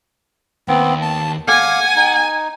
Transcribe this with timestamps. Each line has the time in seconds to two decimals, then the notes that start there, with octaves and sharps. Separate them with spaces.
0.68 D#2 B3 C4
1.02 A5
1.48 F5 F#5 G#5 D6
1.96 D#4